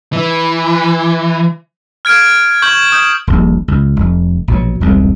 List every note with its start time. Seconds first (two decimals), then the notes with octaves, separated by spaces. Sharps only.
0.13 E3
2.05 F6 G#6 D7
2.62 C#6 G6 F#7
2.92 D#6 G6
3.27 D#1 A#1
3.68 C#2
3.96 F1
4.48 A#1 B2 F#3
4.81 E1 C2 G#2